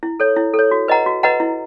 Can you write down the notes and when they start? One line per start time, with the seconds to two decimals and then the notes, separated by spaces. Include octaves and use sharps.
0.03 E4
0.20 A4 C#5
0.36 E4
0.54 A4
0.59 C#5
0.71 F#4
0.88 B4 D#5 F#5 A#5
1.06 F#4
1.23 B4 D#5 F#5 A#5
1.40 E4